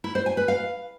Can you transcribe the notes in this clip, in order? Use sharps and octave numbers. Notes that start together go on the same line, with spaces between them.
E4
C5
G#5
B4
F5